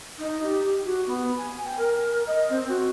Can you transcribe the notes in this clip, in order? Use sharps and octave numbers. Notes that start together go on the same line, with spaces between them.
D#4
G4
F#4
B3
G#5
G5
A#4
D#5
C4
F#4